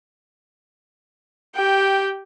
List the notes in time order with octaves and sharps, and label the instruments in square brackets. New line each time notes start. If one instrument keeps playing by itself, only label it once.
[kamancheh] G4 G5